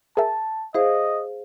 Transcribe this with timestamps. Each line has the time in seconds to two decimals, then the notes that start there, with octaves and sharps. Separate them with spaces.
0.17 G#4 A#4 E5 A5
0.74 E4 G#4 C5 D#5 F5